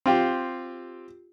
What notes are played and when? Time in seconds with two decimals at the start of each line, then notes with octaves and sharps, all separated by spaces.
0.06 C4 F4 G4